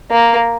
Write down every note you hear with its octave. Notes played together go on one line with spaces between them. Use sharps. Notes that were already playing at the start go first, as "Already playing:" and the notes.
A#3